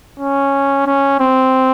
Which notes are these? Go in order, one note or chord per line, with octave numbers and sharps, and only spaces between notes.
C#4
C#4
C4